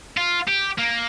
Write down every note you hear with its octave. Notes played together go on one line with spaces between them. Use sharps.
F4
G4
A#3